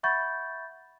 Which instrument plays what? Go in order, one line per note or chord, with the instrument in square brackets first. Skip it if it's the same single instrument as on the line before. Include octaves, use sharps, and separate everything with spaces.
[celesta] E5 F#5 B5 C#6 G6 A6